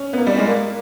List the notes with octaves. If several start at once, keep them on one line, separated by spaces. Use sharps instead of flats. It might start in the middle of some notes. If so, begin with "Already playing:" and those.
Already playing: C#4
B3
A#3
G3
G#3
A#3